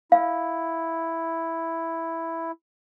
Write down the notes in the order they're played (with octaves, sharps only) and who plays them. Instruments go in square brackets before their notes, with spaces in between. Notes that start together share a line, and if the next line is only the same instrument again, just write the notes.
[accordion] E4 [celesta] F5